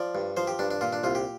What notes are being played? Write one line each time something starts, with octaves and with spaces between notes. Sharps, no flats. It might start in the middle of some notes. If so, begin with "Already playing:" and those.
Already playing: F3 D5
G2
F3 C5
G4
G2 D4
D4
A#2 F4
D4
C2 F4
G4